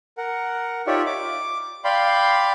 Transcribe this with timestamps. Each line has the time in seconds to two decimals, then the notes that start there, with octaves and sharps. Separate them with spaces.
0.17 A#4 F#5
0.87 D#4 F4 G4 C#5 D5 E5
1.06 D6
1.84 D5 F5 G5 B5 C6